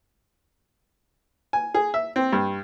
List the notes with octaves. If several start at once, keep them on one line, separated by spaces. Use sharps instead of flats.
G#5
G#4
E5
C4
G2